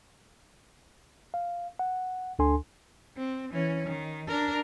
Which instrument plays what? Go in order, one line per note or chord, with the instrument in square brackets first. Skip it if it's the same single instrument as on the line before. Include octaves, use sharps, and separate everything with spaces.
[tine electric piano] F5
F#5
D2 D4 A4 G#5 C6
[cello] C4
E3 C#4
D#3
D4 A#4